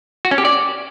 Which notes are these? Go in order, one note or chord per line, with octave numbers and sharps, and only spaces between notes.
F#4
C#4
G4
D5